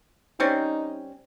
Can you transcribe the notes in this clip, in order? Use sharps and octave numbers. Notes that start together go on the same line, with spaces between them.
G3 C4 C#4 D#4